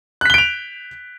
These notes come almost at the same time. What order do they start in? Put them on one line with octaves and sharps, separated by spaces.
F#6 B6 G7 D7 F7